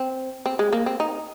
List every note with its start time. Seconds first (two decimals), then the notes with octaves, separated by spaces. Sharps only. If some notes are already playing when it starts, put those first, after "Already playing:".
Already playing: C4
0.46 C4
0.59 G#3
0.73 A#3
0.86 C4
1.00 D#4